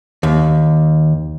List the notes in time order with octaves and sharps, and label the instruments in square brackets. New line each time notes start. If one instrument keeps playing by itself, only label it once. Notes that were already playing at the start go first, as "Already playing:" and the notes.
[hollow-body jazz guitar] D#2